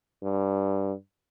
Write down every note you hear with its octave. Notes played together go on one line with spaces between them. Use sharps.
G2